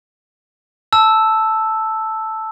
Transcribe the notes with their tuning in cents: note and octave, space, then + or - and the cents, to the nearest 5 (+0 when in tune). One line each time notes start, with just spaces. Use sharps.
A5 +0 E6 +0